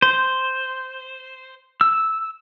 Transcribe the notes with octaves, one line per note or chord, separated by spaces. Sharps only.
C5
E6